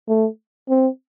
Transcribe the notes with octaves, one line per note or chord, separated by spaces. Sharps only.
A3
C4